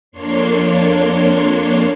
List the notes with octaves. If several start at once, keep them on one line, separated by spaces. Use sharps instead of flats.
F2 A#3 D4 C#5 C6 C7